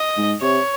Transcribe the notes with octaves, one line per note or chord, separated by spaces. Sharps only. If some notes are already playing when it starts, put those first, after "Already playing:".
Already playing: D#5
G#2
C3 C#5